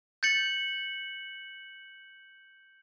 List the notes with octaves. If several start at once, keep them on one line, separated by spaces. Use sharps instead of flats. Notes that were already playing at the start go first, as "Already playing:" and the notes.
G6 A6 C#7 F#7